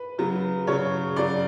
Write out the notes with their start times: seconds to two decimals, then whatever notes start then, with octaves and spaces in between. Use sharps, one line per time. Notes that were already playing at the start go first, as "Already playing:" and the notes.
Already playing: B4
0.18 C#3 F#3
0.67 C#3 F#3 C#5
1.16 C#3 F#3 D5